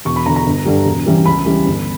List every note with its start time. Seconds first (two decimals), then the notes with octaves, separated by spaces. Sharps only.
0.05 E1 C#6
0.16 B5
0.25 E2 D3 A#5
0.36 A#5
0.46 G1
0.65 G2 D3 G3
0.85 E1
1.06 E2 C#3 E3 G3
1.25 C#2 B5
1.46 C#3 E3 G3
1.66 G1